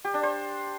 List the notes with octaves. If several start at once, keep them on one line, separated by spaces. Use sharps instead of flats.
G4
D4
C5